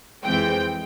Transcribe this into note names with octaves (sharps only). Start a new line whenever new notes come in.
F2 E3 G#3 C4 G5